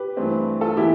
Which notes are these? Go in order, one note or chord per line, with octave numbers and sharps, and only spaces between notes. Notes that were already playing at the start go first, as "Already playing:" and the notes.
Already playing: G4 B4
G2 E3 A3 C4
F4 A4
E3 B3 E4 G4